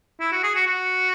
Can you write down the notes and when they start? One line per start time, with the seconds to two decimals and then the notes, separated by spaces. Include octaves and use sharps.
0.20 E4
0.32 F#4
0.43 G#4
0.55 F#4
0.67 F#4